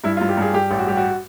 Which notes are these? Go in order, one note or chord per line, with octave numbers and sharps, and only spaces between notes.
G2 E4
F4
G2
G4
G2 G#4
G2 G4
A1
F#4
G3 G4
F#4